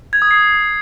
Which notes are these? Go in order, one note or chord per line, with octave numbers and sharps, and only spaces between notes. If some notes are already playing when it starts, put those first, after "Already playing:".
G#6
D#6
C7